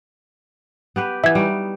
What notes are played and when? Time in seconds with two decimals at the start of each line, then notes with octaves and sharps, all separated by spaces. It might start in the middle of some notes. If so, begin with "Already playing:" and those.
0.96 B3 G4 B4
1.24 E3 B3 E5 G#6
1.35 G3 D#4 F#4